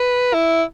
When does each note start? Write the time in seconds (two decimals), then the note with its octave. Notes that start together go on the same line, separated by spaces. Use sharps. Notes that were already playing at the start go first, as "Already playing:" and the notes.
Already playing: B4
0.34 E4